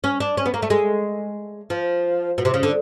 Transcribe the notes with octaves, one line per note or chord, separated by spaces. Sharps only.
C#4
D4
C#4
B3
A#3
A3
G#3
F3
B2
C3
C#3
D3